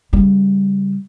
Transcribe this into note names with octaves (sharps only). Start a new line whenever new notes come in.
C#3 G3